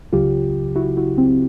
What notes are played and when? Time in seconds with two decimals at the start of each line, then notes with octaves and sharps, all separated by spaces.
0.13 C#2 C#3 F#3 F4 G4
0.76 E4 F#4
0.97 E4 F#4
1.18 C4